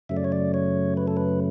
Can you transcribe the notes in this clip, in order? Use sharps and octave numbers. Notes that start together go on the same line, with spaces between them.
F#2 C#3 F#3 A3 E5
D5
C#5
D5
C#5
B4
A4
B4